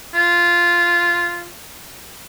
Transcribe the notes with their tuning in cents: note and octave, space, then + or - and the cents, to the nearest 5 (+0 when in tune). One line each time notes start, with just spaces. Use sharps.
F4 -10